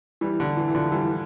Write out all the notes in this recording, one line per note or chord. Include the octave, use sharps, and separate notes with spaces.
E3 G3
D3
E3
E3
D3 F3
E3 G3